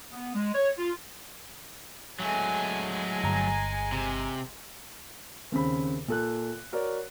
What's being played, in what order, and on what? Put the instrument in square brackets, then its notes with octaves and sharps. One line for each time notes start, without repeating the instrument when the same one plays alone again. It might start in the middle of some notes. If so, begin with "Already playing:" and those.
[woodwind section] B3
G#3
C#5
F4
[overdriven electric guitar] F#3 A3 [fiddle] G#3 G#4
[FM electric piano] G1 A#5
[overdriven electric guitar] C3
[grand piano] D#2 C#3 C4 B5
A#2 A4 F#6
F#4 A#4 C#5 D5